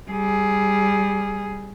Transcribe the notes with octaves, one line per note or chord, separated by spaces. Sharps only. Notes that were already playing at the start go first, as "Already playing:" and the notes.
G3 G#4